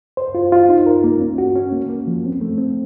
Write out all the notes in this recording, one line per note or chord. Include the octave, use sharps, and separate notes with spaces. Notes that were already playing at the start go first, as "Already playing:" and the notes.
C5
F4
F4
D#4
A#4
A#3
C#4
F#4
C#4
A#3
A#3
F3
C4
A3
C4